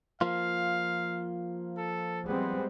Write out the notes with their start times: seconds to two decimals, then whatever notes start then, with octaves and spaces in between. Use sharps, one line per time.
0.21 F3 A#3 F4 F5
1.77 A4
2.27 G3 G#3 B3 C4